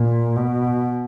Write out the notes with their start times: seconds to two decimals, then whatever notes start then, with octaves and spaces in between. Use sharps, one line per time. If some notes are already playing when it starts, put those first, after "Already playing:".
Already playing: A#2
0.36 B2